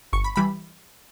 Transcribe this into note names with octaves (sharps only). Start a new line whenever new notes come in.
G1 C#6
B5
E3 G3 B5